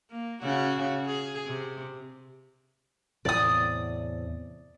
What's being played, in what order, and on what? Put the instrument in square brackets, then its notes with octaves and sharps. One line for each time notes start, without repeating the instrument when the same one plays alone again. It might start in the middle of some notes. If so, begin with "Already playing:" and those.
[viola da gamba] A#3
C#3 F#4
G#4
C3
[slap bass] E2 A2 C3 [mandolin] D5 D#6